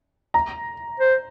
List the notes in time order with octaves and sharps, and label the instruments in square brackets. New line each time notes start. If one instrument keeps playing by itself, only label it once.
[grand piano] A#5
[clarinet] C5